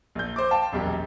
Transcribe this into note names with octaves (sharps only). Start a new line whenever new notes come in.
A#1 G6
C5 D6
F5 G5 A5
E1 A#1 F#2 G4